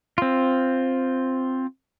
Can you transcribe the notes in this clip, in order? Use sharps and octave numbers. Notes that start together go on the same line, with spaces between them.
C4 F4